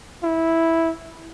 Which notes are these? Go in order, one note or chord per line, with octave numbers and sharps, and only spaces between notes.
E4